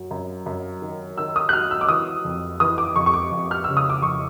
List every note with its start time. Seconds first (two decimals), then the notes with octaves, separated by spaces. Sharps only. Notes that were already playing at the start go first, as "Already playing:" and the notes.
Already playing: F#2 F#3
0.11 F#2
0.46 F#2
0.82 D#3
1.18 D#3 E6
1.36 D#6
1.49 F#6
1.53 F#3 F6
1.71 E6
1.81 D6
1.89 E3 D#6
2.25 F2
2.60 E3 D#6
2.78 D6
2.96 F2 C#6
3.06 C#6
3.14 D6
3.31 F2
3.51 F6
3.64 C#3 E6
3.77 D#6
3.90 D6
4.02 F2 C#6